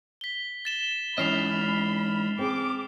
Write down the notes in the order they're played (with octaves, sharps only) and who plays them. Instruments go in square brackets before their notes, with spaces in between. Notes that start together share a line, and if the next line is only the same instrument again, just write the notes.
[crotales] B6 G7
A6 E7 G7
[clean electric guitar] G#2 E3 D#5 [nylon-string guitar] C#4 [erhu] B5 [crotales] F6 C7 F7
[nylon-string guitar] C4 G#4 [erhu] D6